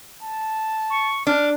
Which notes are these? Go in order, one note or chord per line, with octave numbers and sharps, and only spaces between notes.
A5
C#6
D4 F6